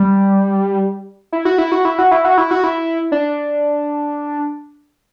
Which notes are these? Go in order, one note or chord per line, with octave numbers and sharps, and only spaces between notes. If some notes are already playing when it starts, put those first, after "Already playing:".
Already playing: G3
E4
F#4
E4
F#4
E4
F#4
E4
F#4
E4
F#4
E4
D4